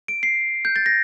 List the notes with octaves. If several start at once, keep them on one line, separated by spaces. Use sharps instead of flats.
D7
C7
G6
A6
A#6